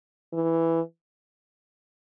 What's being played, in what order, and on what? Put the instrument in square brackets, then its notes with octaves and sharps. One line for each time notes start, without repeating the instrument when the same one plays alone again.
[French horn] E3